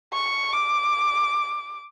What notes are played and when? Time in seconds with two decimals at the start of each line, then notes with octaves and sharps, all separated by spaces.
0.14 C#6
0.53 D6